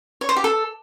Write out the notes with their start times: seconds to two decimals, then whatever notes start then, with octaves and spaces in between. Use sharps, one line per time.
0.21 C#5
0.29 C5
0.36 G4
0.44 A4